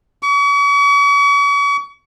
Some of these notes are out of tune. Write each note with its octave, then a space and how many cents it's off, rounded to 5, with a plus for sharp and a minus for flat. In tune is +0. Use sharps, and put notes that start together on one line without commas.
C#6 +40